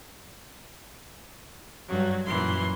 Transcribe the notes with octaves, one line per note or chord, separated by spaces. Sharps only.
G2 F#3
F#2 A#2 E3 C6